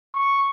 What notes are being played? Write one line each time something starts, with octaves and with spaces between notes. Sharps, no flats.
C#6